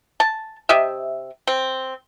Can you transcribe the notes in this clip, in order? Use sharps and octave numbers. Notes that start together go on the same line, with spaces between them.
A5
C3 G4 D#5 E5
C4